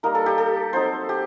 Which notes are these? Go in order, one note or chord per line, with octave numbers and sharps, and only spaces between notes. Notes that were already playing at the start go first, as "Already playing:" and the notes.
G3 A#3 D#4 A#4
A4
G4
A4
F#3 C4 D#4 C5
G4